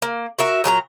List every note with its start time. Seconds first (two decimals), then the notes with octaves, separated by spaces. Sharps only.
0.02 A#3
0.39 F#4 A#4 E5
0.64 A#2 F#3 A4 A#5